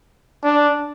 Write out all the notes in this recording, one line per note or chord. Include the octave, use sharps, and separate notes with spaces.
D4